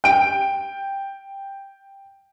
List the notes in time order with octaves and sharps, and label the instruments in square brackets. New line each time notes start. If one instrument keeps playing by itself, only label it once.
[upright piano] G5 D7